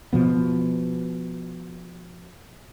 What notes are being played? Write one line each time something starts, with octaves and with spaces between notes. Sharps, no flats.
B2 F3 B3